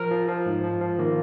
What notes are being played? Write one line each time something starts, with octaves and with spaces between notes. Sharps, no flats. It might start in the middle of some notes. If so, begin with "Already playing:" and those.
Already playing: F3 A#4
F3
F3
G#2
F3
F3
D#3 A#3